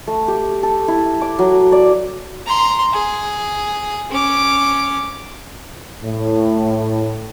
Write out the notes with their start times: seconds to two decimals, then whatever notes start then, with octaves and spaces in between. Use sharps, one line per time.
0.07 A3
0.28 G4
0.63 A4
0.88 E4
1.21 D6
1.39 F#3
1.72 D5
2.47 A#5 C6
2.93 G#4
4.11 C#4 D6
6.03 A2